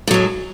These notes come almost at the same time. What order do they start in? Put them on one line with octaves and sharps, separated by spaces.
A2 F#3 G#3